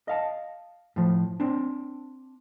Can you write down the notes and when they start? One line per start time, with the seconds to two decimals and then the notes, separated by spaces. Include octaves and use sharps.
0.08 D#5 F5 A5
0.96 A2 F3
1.40 C4 D4